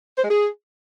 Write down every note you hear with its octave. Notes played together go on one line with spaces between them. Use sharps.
C5
G#3
G#4